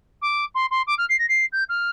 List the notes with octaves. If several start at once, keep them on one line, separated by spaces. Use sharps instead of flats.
D6
C6
C6
D6
F6
C7
A#6
C7
G6
F6